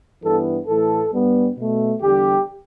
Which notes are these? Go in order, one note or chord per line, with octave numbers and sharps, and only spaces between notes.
G2 E3 G3 B3 A4
A2 E3 A3 A4
G2 G3 B3
B2 A3
E2 D3 G3 G4